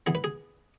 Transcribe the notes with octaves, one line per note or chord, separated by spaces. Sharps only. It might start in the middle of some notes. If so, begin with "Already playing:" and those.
E3 B3 G#4
B4
G#4